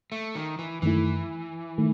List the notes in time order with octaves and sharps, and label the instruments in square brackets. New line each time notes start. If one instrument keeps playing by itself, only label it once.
[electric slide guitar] A3
D#3
E3
[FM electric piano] F#2 D#3 A3 E4 [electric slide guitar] E3
[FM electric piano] D#3 A3